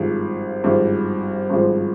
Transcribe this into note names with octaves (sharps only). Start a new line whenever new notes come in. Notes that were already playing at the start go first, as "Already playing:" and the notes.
Already playing: G#1 G2 F3 G#3
G#1 G2 F3 G#3
G#1 G2 F3 G#3